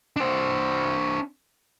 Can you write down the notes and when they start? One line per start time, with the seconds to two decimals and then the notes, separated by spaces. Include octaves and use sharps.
0.16 D4 C5